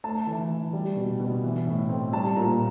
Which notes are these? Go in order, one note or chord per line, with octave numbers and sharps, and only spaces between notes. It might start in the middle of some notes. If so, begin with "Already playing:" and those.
A3 A5
E3
E3
G3
B2
B2
E3
A2
C4
G3 A5
A#2 A#5